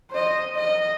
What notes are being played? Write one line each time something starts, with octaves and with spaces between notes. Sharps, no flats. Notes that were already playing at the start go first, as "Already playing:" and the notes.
C5 D#5
D#5